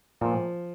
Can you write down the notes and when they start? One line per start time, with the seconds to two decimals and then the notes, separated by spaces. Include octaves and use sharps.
0.21 A#2 F3